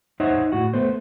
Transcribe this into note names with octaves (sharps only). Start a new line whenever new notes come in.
D#4 C5 C#5 E5 F#5
A2 E4 F#4 F#5
A3 B3 C5